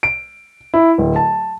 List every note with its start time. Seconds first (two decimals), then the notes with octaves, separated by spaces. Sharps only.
0.03 D7
0.74 E4
0.98 D1
1.16 A5